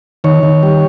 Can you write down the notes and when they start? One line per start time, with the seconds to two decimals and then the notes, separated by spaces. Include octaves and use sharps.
0.24 D#3 C#5
0.43 D#3
0.63 G3